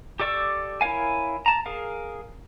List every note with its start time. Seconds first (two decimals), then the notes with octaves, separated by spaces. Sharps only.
0.20 G4 A4 D5 C#6 E6
0.81 E4 A#4 C#5 F5 G#5
1.46 A5 A#5
1.66 G#4 A#4 F5